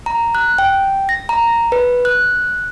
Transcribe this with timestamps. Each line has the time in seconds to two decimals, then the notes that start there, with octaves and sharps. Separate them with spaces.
0.06 A#5
0.35 F#6
0.58 G5
1.09 A#6
1.29 A#5
1.72 B4
2.05 F#6